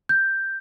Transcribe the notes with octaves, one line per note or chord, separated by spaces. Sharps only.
G6